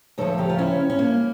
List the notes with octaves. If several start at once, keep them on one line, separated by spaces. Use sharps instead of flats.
D2 C#3 F3 A4 C#5
G4 A#4
F4
C#4 E4
C#4
A#3